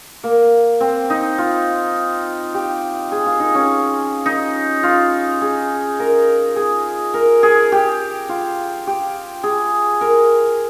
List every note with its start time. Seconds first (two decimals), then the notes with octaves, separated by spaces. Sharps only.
0.24 A#3
0.81 C4
1.10 D#4
1.38 F4
2.54 G4
3.12 G#4
3.26 F4
3.40 D#4
3.55 C#4
4.26 D#4
4.83 F4
5.42 G#4
6.00 A#4
6.56 G#4
7.14 A#4
7.43 G#4
7.72 G4
8.29 F4
8.87 G4
9.43 G#4
10.01 A#4